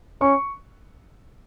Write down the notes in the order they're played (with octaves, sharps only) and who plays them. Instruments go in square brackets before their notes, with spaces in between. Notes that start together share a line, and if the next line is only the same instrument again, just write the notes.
[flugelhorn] C#4 [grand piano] C#6